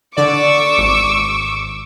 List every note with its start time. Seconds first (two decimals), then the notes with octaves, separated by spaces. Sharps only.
0.17 D3 D5 C#6 D6 E6
0.78 G#1